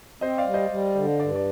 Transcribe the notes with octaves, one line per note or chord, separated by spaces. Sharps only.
C4 C5 D#5
D5 F5
G3
C5 D#5
G3
D3
G2 D5
D5